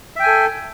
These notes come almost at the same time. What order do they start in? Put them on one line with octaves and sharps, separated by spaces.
E5 G5 G#5 A4